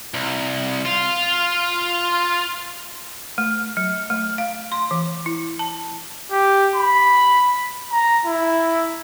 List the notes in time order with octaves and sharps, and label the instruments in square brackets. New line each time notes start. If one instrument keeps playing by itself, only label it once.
[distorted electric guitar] C2
F4
[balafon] A3
F#3
A3
F5
C6
E3
E4
A5
[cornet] G4
B5
A#5
E4